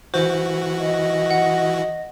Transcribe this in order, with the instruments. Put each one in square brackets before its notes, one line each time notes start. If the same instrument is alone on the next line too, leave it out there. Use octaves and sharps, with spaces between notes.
[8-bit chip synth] E3 F#4 [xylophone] C5
[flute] D#5
[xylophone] F#5